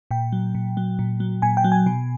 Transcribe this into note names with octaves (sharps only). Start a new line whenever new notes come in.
A#2 G5
F#3
A#2
F#3
A#2
F#3
A#2 G#5
G5
F#3
G#5
B2